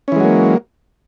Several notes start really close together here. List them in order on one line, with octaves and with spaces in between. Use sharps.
C#4 E3 G#3 F#3 A#3